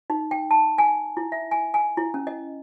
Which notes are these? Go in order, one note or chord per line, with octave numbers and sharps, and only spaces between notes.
D#4
G5
A5
G#5
E4
E5
G#5
G#5
E4
C#4
D#5